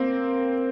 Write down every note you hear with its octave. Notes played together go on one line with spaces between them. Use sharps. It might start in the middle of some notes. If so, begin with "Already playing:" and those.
Already playing: A#3 C4